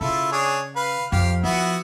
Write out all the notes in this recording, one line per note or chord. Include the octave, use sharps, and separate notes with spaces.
C#3 E4 F4 A4
D4 G#4 C#5
B4 F5
F2 G4 F5
F3 B3 E4 F#4